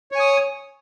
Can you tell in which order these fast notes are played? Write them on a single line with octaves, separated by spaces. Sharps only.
C#5 G#5 D#6